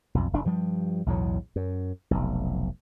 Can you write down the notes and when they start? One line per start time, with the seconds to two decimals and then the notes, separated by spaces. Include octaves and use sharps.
0.14 B1 F2
0.33 F1 D4
0.45 G2 F3 G3
1.06 B1 E2 A2 F#3
1.56 F#2
2.11 F1 B1